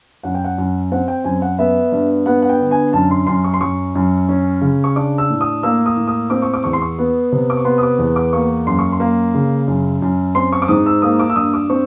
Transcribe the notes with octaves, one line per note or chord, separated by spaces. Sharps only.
F#2 F#5
G5
F#5
F#2
C4 F#5
G5
F#2 G#5
F#5
B3 E5
G2
B3 F#5
F#5
G5
D3
G#5
F#2 A5
C6
F#2 C6
C#6
C6
F#2 C#6
F#2
C#4
C#3
C#6
D4 D6
E6
A2
D#6
A#3 E6
D#6
A2
D#6
C4 D6
C#6
D6
E2 C#6
C6
C#6
B3
C3
D6
C#6
B3 C6
D#6
D6
E2
D6
A#3 C#6
F#2 C6
C#6
C6
A#3
C#3
F#2
F#2
C4 C6
C#6
D6
G#2 D#6
E6
A#3 D#6
D6
E6
G2 D#6
D6
C4 C#6